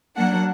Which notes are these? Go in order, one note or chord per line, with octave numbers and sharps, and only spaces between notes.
F#3 A#3 D4 F#5